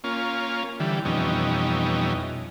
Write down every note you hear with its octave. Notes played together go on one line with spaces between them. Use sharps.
A#3 C#4 F4
D3 E3 G3
F2 B2 E3 G3 C#4 D#4